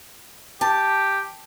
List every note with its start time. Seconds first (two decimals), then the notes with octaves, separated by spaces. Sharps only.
0.61 G4 A5